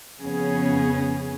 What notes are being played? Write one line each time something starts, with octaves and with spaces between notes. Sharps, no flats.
F2 C#3 B3 C#4 G#4